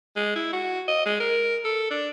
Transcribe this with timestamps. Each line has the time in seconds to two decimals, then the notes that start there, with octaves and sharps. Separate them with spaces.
0.16 G#3
0.35 E4
0.53 F#4
0.88 D#5
1.06 G#3
1.20 A#4
1.64 A4
1.90 D4